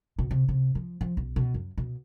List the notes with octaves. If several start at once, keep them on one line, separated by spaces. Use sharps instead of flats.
B2
C3
C3
F3
F3
B1
B2
F#2
B2